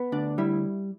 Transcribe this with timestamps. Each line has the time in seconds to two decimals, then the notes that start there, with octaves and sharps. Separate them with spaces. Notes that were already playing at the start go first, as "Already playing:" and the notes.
Already playing: B3
0.12 D2 D4
0.38 G3 E4